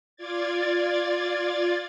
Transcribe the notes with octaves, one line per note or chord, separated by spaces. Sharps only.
F4 D5 G#6 A6